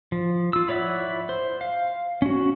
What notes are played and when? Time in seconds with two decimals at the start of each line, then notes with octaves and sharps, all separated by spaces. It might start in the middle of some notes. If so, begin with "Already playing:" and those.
0.12 F3
0.53 F4 E6
0.68 E4 C#5 D5 E5 F#5
1.29 C5
1.61 F5
2.22 C#4 F#4